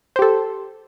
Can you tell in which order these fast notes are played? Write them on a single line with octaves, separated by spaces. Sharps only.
C5 G4 A4